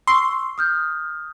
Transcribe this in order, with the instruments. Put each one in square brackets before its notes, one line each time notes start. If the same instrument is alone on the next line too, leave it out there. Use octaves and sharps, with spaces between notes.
[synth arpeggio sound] C6 [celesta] C#6 E6
[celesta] D#6 F6 G6